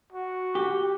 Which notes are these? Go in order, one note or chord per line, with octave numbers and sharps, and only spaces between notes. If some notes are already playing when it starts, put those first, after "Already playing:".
F#4
G4